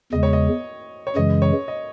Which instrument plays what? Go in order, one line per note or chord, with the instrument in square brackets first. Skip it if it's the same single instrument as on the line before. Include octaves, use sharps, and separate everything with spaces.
[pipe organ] E2 C#3 G#3 [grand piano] D#5
[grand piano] C#5
D#5
C#5
[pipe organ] F#2 C#3 E3 G#3 [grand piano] D#5
[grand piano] C#5
D#5